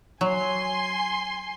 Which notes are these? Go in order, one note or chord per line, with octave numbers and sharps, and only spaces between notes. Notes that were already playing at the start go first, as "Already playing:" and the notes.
F#3 G#5 C6